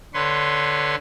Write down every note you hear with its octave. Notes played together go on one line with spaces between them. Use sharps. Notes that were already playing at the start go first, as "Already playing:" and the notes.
D3 B4 C#5 C6